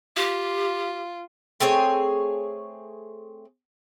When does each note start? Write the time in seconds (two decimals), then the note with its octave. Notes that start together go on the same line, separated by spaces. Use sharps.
0.16 F4 G4
1.60 A3 C4 G#4 C#5